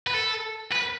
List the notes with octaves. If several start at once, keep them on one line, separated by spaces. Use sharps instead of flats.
B4
A4
B4